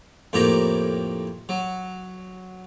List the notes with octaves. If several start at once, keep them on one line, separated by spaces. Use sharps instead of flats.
F2 A2 A#3 G4 A#5
F#3